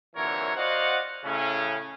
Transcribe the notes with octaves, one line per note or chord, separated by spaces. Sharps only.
C2 A#2 D3 E3 A#4 C#5
F#4 C5 D5 D#5 F5 F#5
A2 C#3 C#4 E4